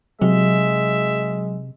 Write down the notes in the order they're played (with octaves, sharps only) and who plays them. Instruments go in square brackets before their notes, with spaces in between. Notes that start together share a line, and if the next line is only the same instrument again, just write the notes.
[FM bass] C3 [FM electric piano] F#3 [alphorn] G#3 [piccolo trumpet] E5